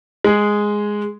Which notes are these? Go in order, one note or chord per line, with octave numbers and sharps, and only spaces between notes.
G#3 G#4